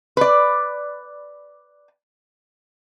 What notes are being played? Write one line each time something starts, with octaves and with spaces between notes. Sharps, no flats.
B4 D5